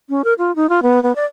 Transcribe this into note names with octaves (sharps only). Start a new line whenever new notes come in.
C#4
A#4
F4
D#4
F4
B3
B3
D5